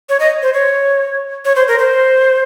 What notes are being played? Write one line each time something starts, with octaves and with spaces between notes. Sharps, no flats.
C#5
D#5
C5
C#5
C#5
C5
A#4
C5